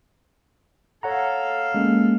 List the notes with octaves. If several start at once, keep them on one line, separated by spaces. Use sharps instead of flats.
A4 C#5 F5 F#5 A#5
G#3 A#3 C#4